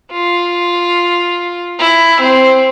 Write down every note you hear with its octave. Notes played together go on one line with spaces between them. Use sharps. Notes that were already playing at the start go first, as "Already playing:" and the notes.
F4
E4
C4